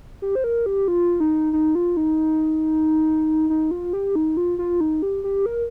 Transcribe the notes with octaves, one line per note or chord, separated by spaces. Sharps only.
G4
C5
A#4
G4
F4
D#4
D#4
F4
D#4
D#4
F4
G4
D#4
F4
F4
D#4
G4
G4
A#4